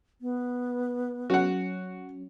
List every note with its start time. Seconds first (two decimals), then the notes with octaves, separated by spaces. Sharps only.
0.21 B3
1.30 F#3 C#4 F#4 F#5